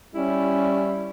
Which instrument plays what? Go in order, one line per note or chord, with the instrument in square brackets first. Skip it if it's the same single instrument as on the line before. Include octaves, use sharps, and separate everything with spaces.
[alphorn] G3 [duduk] C#4 [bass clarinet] E4